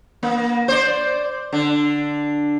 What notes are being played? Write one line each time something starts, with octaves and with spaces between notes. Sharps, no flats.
A#3
C5 D5
D3